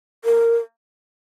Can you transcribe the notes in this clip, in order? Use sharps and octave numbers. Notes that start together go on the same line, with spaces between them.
A#4